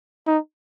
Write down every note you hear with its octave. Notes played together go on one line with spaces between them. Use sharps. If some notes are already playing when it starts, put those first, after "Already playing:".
D#4